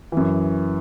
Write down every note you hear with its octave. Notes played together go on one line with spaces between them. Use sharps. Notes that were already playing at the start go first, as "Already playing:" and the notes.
F#2 E3